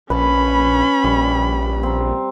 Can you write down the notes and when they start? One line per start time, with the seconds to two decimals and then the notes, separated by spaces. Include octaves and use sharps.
0.10 A#1 C#4 B4 A5 B5
1.04 A#1 G3
1.83 C4 A#5